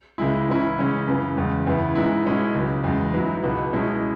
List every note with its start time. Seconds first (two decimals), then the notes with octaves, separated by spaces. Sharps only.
0.18 C#2 C#3 G#3 E4
0.48 G#2 E3 C#4 E4
0.78 C#3 G#3 C#4
1.07 F#2 C#3 E3 B3
1.36 E2 C#3 G#3
1.66 E2 C#3 E3 B3 E4
1.95 G#2 G#3 B3 E4
2.25 B2 G#3 C#4 E4
2.55 C#2 C#3 F#3
2.84 E2 C#3 G#3
3.14 G#2 F#3 B3 E4
3.43 C#2 B2 B3
3.72 B2 G#3 C#4 E4